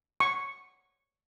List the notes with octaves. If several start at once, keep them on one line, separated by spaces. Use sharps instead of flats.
C#6